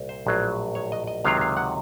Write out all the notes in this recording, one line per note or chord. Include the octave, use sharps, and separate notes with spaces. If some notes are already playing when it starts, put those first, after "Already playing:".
Already playing: C2 A#2
C5
A#1 A2 F#3
C#5
D#5
D#5
C#2 C3 D#3 F#3 F5
F5
F#5